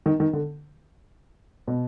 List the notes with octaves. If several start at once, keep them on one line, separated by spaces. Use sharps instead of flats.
D#3
D#3
D3
B2